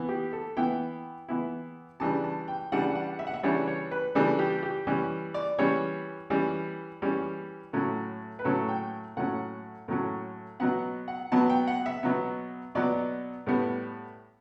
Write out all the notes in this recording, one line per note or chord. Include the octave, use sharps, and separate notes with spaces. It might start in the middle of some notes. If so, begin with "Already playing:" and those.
Already playing: E3 B3 E4
G4
A4
E3 B3 E4 G5
E3 B3 E4
C#3 E3 G3 D4 A5
A5
G5
C#3 E3 G3 D4 F#5
F#5
E5
F#5
E5
C#3 E3 G3 D4 C#5
C#5
B4
C#3 E3 G3 D4 A4
G4
G4
E3 G3 C#4
D5
E3 G3 C#4 C#5
E3 G3 C#4
E3 G3 C#4
A2 F#3 C#4
B4
A2 F#3 C#4 A4
G5
A2 F#3 C#4 F#5
A2 F#3 C#4
B2 F#3 B3 F#5
F#5
B2 F#3 B3 A5
G5
F#5
E5
B2 F#3 B3
B2 F#3 B3 D5
A2 G3 B3